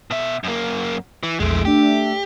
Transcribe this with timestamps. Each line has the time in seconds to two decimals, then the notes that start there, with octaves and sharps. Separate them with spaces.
0.11 B2 E5
0.44 F#2 A#3
1.23 E3
1.40 A#1 E2 G#3 A3 D7
1.65 A3 D4 G4 E5